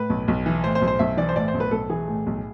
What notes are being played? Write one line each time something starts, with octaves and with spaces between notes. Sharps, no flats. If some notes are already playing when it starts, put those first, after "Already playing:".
Already playing: A2 B4
B1
B1
E3
A2 C5
C5
B1
C5
B1 E5
E3 D5
C5
A2 D5
C5
B1
B4
B1 A4
E3 G#4
A2
B1